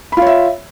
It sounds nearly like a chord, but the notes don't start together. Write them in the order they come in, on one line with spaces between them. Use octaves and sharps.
B5 F4 C#5 E5